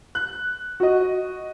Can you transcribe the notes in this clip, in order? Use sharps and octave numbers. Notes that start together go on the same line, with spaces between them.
F#6
F#4 D#5